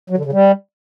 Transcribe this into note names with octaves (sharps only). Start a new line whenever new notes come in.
F#3
D3
C#3
G3